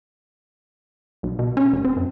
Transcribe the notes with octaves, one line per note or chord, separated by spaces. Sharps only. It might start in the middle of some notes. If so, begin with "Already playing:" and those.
B1
B2
C#4
F1
C4
F#2